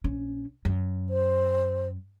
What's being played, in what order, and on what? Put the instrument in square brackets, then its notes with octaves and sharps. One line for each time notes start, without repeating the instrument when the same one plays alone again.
[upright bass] A#1 C#4
F#2
[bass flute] C5